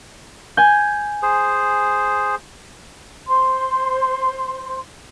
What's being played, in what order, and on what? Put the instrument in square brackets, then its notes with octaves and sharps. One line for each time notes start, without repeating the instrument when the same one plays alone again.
[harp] G#5 G6
[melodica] G#4 C5
[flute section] C5 C6